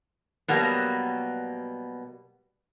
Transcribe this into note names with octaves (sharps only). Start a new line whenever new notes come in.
B2 F#3 G3 A#3 B3